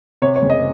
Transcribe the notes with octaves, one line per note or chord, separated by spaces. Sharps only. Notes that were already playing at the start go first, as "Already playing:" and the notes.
C3 C#5
C#5
F#1
D#5